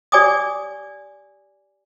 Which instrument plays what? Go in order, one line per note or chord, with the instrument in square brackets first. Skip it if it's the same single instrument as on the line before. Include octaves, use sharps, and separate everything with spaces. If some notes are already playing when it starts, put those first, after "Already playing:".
[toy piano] G4 D5 G#5 D6 D#6